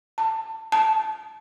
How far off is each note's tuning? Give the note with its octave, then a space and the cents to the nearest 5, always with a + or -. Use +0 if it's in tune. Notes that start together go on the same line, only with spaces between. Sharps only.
A5 +15
A5 -5